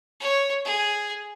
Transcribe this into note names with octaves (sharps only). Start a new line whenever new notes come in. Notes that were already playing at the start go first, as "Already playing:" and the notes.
C#5
G#4